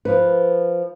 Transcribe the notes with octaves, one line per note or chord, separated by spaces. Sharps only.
F3 B4